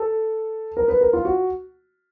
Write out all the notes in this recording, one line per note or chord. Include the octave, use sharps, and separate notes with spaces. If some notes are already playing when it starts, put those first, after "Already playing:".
Already playing: A4
A#4
B4
A#4
F4
F#4